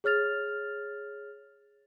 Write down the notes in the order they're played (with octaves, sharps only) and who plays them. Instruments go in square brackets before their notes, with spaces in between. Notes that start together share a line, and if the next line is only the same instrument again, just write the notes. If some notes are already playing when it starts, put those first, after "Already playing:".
[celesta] G#4 C#5 F6 A6 F7